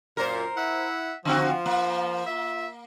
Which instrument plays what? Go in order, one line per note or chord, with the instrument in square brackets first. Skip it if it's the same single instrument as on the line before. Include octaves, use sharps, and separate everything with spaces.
[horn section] F#2 A#2 [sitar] A#4 C5
[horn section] E4 E5 F#5
[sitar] D3 C4 F#4 [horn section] F3
[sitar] A#3
[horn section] F4 E5